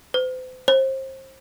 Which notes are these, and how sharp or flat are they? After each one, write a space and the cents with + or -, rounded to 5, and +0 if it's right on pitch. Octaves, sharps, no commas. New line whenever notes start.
C5 -40
C5 +30